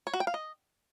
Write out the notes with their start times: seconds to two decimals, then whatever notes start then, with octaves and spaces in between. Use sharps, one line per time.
0.07 C#5
0.14 F#4
0.20 G5
0.27 F5
0.34 D#5